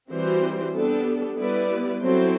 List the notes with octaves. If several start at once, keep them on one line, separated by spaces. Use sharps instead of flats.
E3 G3 C4 F#4 C5
G3 B3 D4 A4
G3 B3 E4 B4 D5
F#3 C4 E4 A4 C5